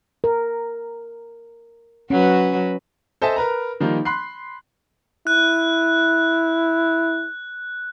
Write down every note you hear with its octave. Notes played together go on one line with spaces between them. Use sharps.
A#4
F#3 C#4 F#4 B4
A4 C5 D#5 E5 G#5 A5
A#4 B4 A#5
D#3 F3 G3 A#3 D#4
B5 C6 F#6 C7
E4 F#6